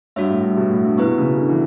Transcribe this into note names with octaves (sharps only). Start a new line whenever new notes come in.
G2 F#4 C#5 E5
A2
G2
B2
A2
G2
B3 E4 B4
B2
C#3
B2
D3
E3